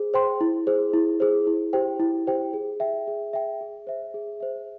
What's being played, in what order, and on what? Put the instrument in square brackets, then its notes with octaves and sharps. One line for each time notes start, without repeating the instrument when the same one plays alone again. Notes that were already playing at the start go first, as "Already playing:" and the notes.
Already playing: [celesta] G#4 C5
C5 G5 C6
E4
G#4 C5
E4
G#4 C5
E4
G4 C5 G5
E4
G4 C5 G5
G#4
E5 G5
G#4
E5 G5
G#4
C5 E5
G#4
C5 E5